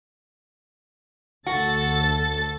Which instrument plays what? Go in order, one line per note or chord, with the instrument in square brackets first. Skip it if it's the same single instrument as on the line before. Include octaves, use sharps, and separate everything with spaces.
[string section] D2 A4 A6 [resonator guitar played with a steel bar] F#4